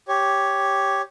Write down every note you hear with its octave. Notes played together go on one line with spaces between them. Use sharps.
G4 C#5